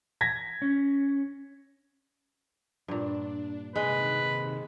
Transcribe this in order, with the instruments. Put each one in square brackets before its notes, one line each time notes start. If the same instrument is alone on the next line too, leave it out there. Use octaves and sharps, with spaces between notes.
[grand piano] G#6 A#6 B6
[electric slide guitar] C#4
[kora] G2 A#2 [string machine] D4
[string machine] C3 D#3 [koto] G#3 [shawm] B4